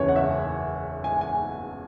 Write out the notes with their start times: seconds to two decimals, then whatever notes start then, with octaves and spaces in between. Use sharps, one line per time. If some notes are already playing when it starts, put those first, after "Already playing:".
Already playing: F#1 E2 E3 C#4 E4 B4 C#5
0.09 F#5
0.16 E5
1.04 G#5
1.21 G#5